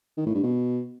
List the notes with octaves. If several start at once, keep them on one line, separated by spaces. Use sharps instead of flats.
D#3
A2
G2
B2